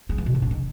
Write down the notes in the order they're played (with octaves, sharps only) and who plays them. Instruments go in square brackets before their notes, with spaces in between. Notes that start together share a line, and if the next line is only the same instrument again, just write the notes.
[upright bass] G#3
E3
B2
A2
C#3
D#3